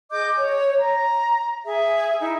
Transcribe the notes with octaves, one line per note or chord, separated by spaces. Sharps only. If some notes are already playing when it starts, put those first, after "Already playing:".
G#4 D#5 D6 G6
C#5
A#5
G#4 E5
D#4 E4